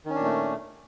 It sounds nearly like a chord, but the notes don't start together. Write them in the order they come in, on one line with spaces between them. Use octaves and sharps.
D#3 C#4 D4 A#2 A3